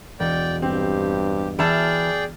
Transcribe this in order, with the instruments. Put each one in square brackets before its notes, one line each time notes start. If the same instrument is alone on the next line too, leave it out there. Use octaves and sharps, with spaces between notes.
[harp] E1 [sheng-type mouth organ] D5 G5
[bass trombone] G2 [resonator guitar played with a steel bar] C4 [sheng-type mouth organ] G4
[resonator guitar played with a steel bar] E3 A5 [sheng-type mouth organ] G#4 D5 G5 [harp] F6 A6